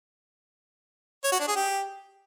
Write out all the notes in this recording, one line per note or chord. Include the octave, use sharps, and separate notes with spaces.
C#5
F#4
D4
G#4
G4